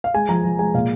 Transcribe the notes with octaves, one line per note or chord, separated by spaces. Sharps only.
F5
G#3 G#5
F3 A#5
F3
G#3 G#5
A#2 F5